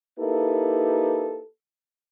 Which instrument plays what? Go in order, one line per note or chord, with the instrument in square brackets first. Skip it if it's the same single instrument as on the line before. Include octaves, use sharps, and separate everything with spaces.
[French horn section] A#3 D#4 E4 G4 A4 B4